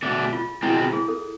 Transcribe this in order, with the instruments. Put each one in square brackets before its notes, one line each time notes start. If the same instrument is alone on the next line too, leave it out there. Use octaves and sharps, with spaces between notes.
[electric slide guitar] B2 A3 D4 [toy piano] G#4
[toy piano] F4
[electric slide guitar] B2 G#3 C4 [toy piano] E4
[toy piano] F4
G#4
A4